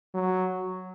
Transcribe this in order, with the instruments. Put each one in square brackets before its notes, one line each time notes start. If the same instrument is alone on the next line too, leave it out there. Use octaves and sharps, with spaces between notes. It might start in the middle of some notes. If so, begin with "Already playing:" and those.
[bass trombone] F#3